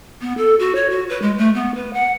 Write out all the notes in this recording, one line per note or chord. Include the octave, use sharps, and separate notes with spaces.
B3
A4
F#4
C#5
F#4
B4
G#3
A3
B3
B4
F#5